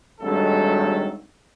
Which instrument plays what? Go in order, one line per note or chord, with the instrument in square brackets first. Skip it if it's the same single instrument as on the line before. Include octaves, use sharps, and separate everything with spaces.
[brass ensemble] G#1 G2 D#3 F#3 A3 A4